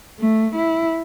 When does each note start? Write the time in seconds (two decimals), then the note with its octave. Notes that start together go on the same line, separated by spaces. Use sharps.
0.19 A3
0.55 E4